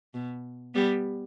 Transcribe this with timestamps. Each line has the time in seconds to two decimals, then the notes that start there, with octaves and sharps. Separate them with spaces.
0.14 B2
0.74 G3 B3